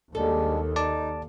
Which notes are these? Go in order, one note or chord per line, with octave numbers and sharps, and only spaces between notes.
D#2 G3 G#3 D4 A4
D#4 D5 A5 D6